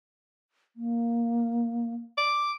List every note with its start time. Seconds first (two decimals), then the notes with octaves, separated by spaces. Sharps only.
0.76 A#3
2.18 D6